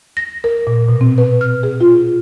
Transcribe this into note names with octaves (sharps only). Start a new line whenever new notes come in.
A#6
A#4
A#2
B2
C4
B4
F6
G#4
F4